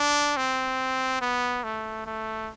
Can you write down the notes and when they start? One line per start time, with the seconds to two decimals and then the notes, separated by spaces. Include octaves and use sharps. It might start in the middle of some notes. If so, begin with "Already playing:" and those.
Already playing: D4
0.37 C4
1.22 B3
1.64 A3
2.06 A3